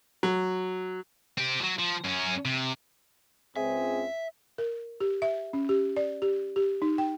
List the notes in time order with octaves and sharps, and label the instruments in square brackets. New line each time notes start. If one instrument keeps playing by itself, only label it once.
[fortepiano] F#3
[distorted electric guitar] C4 G4
F3 F#3
F3
F#2 C#4
C3
[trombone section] C#2 C4 [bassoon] G#4 [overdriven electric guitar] E5
[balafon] A#4
G4
E5
C#4
G4
D5
G4
G4
D#4
G5